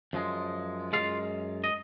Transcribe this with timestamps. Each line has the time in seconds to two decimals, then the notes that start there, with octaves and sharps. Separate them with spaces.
0.13 F#2 F3 G#3
0.93 F#2 F3 G#3 F4 F5
1.64 D#5